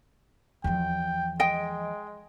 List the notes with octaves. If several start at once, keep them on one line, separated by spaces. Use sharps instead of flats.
E2 F3 G5
G#3 D#5 G5